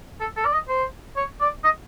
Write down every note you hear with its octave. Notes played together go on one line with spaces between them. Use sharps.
A4
A4
D5
D#5
C5
C#5
D5
D#5